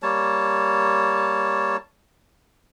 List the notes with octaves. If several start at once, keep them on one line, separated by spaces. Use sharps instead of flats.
G3 A#3 C#5 A5